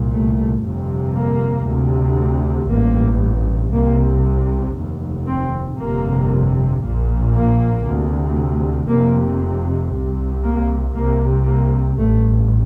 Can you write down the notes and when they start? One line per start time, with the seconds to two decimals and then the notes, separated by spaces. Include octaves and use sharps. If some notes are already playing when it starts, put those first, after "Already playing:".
Already playing: C2 A#2
0.10 A3
0.61 G1 F2 C3
1.13 A#3
1.64 D2 C3
2.68 A1 G2 A#3
3.72 C2 C3 A#3
4.75 F1 D#2
5.26 C4
5.78 G1 F2 C3 A#3
6.81 A#1 A#2
7.33 A#3
7.85 D2 C3
8.88 F1 F2 C3 A#3
9.92 C2 C3
10.43 A#3
10.94 C2 C3 A#3
11.46 A#3
11.98 A1 G2 A3